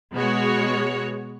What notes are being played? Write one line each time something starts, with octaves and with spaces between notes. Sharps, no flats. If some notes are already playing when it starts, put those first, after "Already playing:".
B2 G#3 B3 F#4 C#5